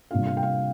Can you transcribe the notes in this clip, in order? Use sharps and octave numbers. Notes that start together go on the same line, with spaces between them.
C3 G3 A#3 D4 F4 F5
F5
G5
F5